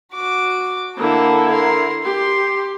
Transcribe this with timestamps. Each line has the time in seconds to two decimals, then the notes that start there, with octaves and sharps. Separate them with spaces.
0.14 F#4 D6
0.97 D3 A#3 E4 A4
1.51 A#4 C6
2.05 G4 C6